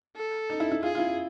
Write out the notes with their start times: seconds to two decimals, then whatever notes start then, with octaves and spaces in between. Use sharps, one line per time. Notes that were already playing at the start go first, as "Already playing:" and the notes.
0.17 A4
0.50 D#4
0.60 E4
0.72 E4
0.83 F4 G#4
0.95 F4
0.98 E4